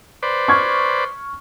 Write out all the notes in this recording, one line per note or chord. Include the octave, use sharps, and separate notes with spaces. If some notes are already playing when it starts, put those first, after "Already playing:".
B4 C5 D5
C#6 F6 G#6